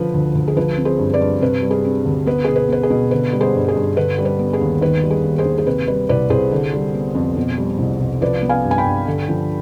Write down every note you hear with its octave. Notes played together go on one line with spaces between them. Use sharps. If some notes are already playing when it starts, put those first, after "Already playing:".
Already playing: D3 F3 B4
D2
D2
G#4
F3 B4
C4
G#4 C5
G2
B4 D5
G2
C3 B4
G3
G#4
C4
D2
B3 B4
B2 G#4
B4
B3 B4
G#4
B2
D3 B4
G3
G#4 C5
G2
G#4
G2
D3 B4
G3
B4
B3
G#4
D#2
D#3 B4
G3
G#4
D#2
G#4 C5
D#2
G#4
C3 B4
G3 B4
C2 B4 D5
C2 G#4 C5
D3
G3
B3
F2
B2
G3
C2
C2
F3 B4 D5
B3
F5 G#5
G2
G#5
G5 B5
G2
D3
F3